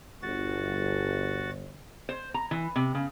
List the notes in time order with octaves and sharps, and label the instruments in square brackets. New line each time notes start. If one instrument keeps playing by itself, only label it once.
[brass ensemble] G1 [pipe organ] F#4 A6
[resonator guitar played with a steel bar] C5
A#5
E3
C3
C#3